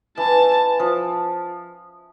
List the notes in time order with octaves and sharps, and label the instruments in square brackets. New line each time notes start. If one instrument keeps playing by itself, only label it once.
[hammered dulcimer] E3 [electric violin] A5
[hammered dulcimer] F3